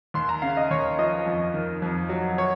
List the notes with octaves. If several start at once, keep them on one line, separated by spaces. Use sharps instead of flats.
D#2 C6
A#5
C#3 F5
D#5
D#2 C#5
F3 D#5
F2
D#3
F2
F#3
C#5